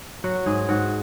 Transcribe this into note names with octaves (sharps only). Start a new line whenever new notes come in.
F#3 F#4
G#2 G#4
G#2 F#4